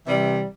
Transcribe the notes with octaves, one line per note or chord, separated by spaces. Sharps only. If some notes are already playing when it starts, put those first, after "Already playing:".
C3 E3 G3